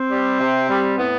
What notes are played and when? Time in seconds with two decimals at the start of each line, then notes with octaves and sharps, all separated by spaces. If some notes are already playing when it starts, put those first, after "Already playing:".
Already playing: C4
0.10 G3
0.39 C3
0.68 G3
0.97 A2 B3